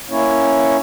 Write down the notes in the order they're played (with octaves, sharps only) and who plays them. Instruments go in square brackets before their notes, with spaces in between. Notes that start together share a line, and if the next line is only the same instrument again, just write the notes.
[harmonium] A#3 C#4 E4 C#5